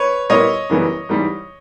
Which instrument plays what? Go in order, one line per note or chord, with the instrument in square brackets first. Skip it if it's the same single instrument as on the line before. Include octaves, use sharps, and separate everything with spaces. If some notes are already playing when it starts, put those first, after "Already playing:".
Already playing: [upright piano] B4 C#5
A#2 G3 B3 E4 C#5 D#5
F#2 C#3 E3 G3 B3
G#2 E3 G3